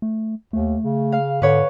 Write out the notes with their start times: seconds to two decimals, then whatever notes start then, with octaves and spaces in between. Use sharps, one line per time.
0.02 A3
0.53 D#2 A3
0.84 C#3
1.12 F5
1.42 G#2 D3 B4 C#5